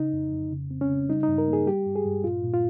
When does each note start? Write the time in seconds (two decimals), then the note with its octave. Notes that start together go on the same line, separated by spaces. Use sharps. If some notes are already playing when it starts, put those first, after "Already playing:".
Already playing: C#3 D#4
0.13 F2
0.32 F2
0.52 C#3
0.71 C4
0.81 C#4
0.90 C#3
1.09 G3 D#4
1.23 G2 D#4
1.38 A#4
1.48 A#3
1.53 G#4
1.67 G3 G4
1.86 G2
1.96 G#4
2.06 G2
2.24 A#2 F4
2.43 A#2
2.54 F4